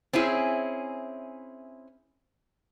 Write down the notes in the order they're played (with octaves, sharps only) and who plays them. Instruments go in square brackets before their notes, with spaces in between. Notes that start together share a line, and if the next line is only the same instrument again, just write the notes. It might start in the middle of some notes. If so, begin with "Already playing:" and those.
[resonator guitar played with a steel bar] C4 C#4 E4 G#4